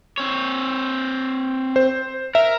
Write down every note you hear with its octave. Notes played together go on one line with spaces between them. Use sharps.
C4 C#5
C5
A#4 E5